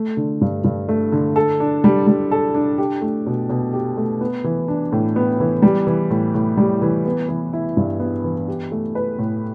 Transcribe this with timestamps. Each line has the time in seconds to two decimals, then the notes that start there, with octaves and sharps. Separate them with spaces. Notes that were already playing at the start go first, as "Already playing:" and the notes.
Already playing: A3
0.17 D3
0.41 G2
0.64 G2
0.89 A3
1.12 D3
1.36 A4
1.60 D4
1.84 G3
2.07 G3
2.31 A4
2.54 D4
2.78 G4
3.01 A3
3.26 B2
3.49 B2
3.73 G4
3.97 A3
4.21 B3
4.44 E3
4.68 D4
4.92 A2
5.16 B3
5.40 E3
5.62 G3
5.87 E3
6.10 A2
6.34 A2
6.57 G3
6.82 E3
7.06 B3
7.29 E3
7.53 E4
7.77 G2
8.00 B3
8.24 E3
8.48 G4
8.72 A3
8.95 B4
9.19 A2